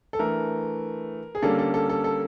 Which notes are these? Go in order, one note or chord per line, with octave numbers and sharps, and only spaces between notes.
A4
E3 A3 D4 A#4
G#4
D3 G3 A#3 C#4 A4
A4
A4
A4
A4